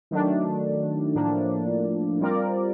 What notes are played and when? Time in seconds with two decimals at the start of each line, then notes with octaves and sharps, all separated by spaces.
0.11 D#3 F#3 A3 D4
1.15 A2 F3 A#3 D4
2.20 G3 C4 F4 A#4 D5